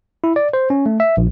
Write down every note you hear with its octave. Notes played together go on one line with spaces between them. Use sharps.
E4
D5
C5
C#4
A3
E5
A#1